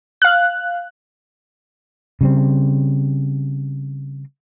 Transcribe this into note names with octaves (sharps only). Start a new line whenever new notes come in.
F5 F#6
C#3 G3 C4